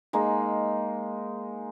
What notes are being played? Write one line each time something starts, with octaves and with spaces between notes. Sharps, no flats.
G#3 A#3 D#4